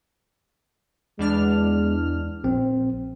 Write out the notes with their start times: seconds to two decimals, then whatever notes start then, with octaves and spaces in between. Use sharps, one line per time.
1.19 E2 G#3 D4 F6
2.44 A#1 C4